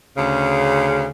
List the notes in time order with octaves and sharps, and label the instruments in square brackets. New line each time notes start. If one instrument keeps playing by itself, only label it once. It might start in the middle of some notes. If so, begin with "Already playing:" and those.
[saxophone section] D2 C#3